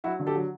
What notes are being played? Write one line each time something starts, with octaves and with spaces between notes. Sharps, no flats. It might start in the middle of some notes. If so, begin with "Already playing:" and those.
F#3 E4 F#4
D3
G4 A4
F#3